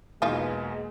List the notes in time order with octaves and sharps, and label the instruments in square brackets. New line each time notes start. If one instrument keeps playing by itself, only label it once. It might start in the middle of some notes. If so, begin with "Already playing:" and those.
[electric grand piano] E2 B2 A#3 [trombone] G#3 [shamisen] D#4 F4 F5